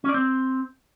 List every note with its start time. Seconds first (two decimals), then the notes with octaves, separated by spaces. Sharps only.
0.04 C#4
0.09 D5
0.14 C4